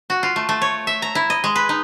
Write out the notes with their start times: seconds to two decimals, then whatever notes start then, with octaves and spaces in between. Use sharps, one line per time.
0.10 F#4
0.23 F4
0.36 A3
0.49 A3
0.62 C#5
0.87 E5
1.02 A#5
1.15 E4
1.30 D#5
1.44 G#3
1.56 B4
1.69 D#4